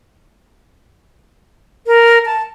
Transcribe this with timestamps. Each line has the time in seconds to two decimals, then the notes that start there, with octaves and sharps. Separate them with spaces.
1.87 A#4
2.26 A5